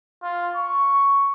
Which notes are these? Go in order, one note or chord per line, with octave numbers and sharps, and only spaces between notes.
F4
C#6